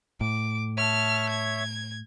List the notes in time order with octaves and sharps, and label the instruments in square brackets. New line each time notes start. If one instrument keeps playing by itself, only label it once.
[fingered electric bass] A2 [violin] D6
[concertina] C#5 E5 [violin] A5 F6
[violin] G#6